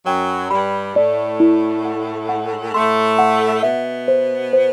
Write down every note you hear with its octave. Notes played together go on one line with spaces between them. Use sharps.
F#2 F#3 G5
G2 G3 B5
A2 A3 D5
E4
F#5
F#5
A2 A3 C6
F#5
B2 B3 E5
C5
C5